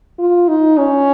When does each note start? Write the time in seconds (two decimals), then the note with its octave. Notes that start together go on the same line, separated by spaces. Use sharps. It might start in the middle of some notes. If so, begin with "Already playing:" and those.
0.19 F4
0.48 D#4
0.78 C#4